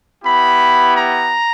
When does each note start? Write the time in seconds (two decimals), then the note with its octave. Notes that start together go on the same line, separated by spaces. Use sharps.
0.24 B3 E4 G4 B5
0.97 A#5